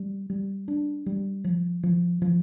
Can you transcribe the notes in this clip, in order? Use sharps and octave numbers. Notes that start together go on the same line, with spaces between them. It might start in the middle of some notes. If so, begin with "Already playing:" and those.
Already playing: G3
G3
D4
G3
F3
F3
F3